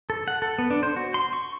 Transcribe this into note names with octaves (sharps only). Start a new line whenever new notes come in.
A4
F#5
A4
B3
D4
C5
F#4
C6
C#6